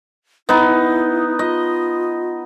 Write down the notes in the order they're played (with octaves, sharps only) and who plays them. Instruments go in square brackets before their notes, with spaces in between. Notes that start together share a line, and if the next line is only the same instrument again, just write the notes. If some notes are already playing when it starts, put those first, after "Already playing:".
[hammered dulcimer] B3 D#4 [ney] E4
[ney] F4 [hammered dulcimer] D#5